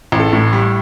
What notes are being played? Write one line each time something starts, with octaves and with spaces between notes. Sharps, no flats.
A1
A4
A2
G3